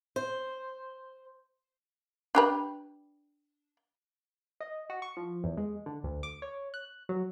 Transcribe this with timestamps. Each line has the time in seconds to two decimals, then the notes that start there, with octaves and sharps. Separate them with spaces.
0.16 C5
2.35 D4 G4 B4
4.61 D#5
4.90 F#4
5.02 C#6
5.17 F3
5.44 E2
5.57 G#3
5.86 D3
6.04 D2
6.23 D6
6.42 C#5
6.74 F#6
7.09 F#3